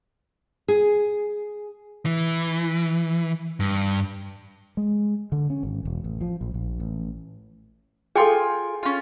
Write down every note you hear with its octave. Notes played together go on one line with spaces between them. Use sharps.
G#4
E3
G2
G#3
D3
C#4
G#1
E1
A1
F3
A#1
A#1
A1
F4 G#4 A4 G5 G#5
C#4 F4